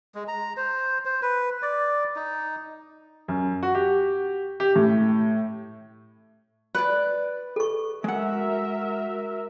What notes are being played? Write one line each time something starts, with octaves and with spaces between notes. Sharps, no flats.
G#3
A#5
C5
C5
B4
D5
D#4
F#2
F#4
G4
G4
A2
B4 D5
A4 C#6
G#3 F#4 A#4 E5 F#5